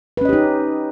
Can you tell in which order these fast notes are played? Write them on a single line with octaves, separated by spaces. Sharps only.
B4 C#4 D#5 G4 D#4